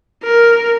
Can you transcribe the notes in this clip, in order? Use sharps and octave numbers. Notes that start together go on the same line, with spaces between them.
A#4